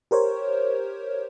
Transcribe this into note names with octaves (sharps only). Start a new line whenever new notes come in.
G4 A#4 C5 C#5